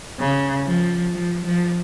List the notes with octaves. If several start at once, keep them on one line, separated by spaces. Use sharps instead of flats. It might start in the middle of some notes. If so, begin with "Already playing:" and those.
C#3
F3
F3
F3